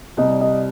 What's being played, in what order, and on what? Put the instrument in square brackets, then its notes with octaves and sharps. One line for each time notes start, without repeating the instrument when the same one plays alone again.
[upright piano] C2 C3 G3 [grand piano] D#5
[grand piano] D#5